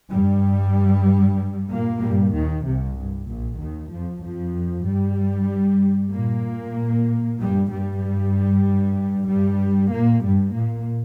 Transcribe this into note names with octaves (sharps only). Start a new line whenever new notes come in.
G2 G3
A#2 A#3
G2 G3
D#2 D#3
C2 C3
G2
A#1 A#2
D#2 D#3
F2 F3
F2 F3
G2 G3
A#2 A#3
G2 G3
G2 G3
G2 G3
A#2 A#3
G2 G3
A#2 A#3